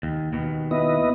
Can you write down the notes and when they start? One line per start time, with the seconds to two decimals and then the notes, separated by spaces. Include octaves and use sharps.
0.03 D#2
0.33 D#2 B2
0.71 B3 E4 D#5